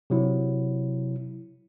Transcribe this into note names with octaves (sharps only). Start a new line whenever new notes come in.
C3 F#3 E4